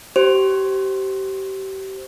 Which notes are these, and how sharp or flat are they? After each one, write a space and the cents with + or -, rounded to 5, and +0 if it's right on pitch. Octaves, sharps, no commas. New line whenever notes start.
G4 -30 C5 +0 C6 +45